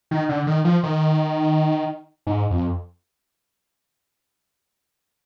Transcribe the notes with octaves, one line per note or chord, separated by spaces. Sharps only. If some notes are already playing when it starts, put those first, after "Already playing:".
D#3
D3
D#3
F3
D#3
G#2
F2